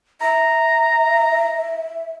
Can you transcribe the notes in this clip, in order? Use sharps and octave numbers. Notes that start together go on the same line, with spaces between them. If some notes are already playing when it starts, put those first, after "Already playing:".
E5 A#5